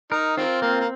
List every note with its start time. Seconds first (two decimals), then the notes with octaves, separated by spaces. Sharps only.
0.12 D#4 A#4
0.37 D#3 C4 F4
0.62 A#3 C4
0.80 A#3